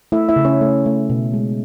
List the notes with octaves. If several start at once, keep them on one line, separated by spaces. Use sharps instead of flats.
A3 E4 E5
E4 E5
C#3
C#4 C#5
A3
A3
B2
G#3